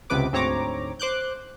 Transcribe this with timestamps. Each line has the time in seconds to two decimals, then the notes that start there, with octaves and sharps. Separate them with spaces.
0.10 C#2 C3 B3 B4 D6
0.32 D2 G#2 C4 C#5 A#5 D6
1.00 C5 D6 F#6 G6